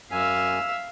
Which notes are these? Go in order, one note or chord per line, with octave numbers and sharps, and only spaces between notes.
F#2 E5 F5 G#5